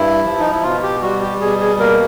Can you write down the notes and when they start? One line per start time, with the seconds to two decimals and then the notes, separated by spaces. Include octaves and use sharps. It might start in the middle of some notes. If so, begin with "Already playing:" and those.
Already playing: G2 E4
0.24 F3
0.39 D#4
0.51 E4
0.63 B2 F4
0.83 G4
1.02 G3 F#4
1.21 G4
1.41 B2 G#4
1.61 G#4
1.80 A#3 A#4